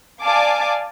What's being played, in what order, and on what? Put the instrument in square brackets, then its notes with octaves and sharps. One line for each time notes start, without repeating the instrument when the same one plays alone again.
[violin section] D5 F5 G#5 A5 D6